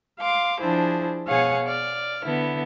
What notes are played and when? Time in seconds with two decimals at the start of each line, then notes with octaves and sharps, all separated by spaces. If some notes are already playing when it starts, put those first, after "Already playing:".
0.20 F5 C6 D6
0.60 F3 D4 E4 G#4 C5
1.28 B2 G#4 C#5 F5 F#5 G#5
1.66 D5 F6
2.24 D3 B3 E4